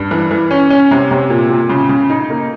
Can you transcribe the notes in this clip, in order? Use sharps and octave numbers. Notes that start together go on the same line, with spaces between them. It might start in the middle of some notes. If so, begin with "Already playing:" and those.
Already playing: G2
E3
E3
C#4
C#4
C3
C3
A#2
A#2
C#3
C#3
D#4
A#3